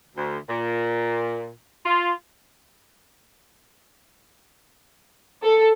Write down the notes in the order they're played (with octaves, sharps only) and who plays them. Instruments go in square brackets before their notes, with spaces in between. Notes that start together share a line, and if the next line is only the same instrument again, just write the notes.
[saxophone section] D2
A#2
F4
[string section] A4